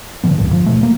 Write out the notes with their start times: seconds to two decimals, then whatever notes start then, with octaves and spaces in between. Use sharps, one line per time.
0.24 D3 D#3 F3 B3
0.37 D#1 A1 D2 G2
0.53 F3
0.66 B2 A3
0.83 A#3